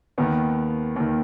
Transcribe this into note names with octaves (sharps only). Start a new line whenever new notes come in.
D#2 D#3 B3
D#2 D#3